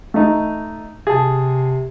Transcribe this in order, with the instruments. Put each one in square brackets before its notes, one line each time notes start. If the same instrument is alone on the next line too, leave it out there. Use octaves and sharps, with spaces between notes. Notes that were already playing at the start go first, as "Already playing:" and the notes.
[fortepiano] A3 D#4
[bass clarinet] C3 [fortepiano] G#4 A5